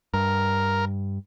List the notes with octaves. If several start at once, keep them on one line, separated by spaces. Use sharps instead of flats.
G2 A#4